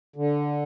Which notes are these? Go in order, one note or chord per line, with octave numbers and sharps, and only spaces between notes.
D3